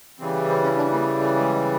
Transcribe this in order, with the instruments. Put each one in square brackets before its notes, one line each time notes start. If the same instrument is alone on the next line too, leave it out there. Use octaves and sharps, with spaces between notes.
[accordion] C#3 E3 G3 C4
C4
C#4
D4
A#3
A3
A3
G#3